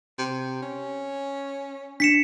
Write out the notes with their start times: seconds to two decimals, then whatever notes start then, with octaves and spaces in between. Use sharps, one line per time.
0.18 C3
0.62 C#4
2.00 D4 B6 C#7 E7